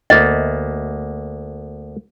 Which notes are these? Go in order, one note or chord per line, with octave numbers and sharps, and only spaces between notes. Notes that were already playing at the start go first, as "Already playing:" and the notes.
D2 A#3 B3 D#5